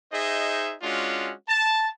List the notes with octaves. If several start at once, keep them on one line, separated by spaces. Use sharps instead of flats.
D#4 G#4 C5 D#5 E5
G#3 C#4 D4 F4 F#4
A5